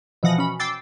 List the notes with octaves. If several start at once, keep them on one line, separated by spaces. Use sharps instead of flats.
B2 E3 F3 F#5 D#6 A#6
C#4 B5
G5 D6 E6 A6 C7